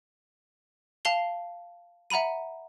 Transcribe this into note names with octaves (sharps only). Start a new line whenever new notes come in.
F5 A5 C7 F7 G7
E5 F#5 A#5 B5 D#7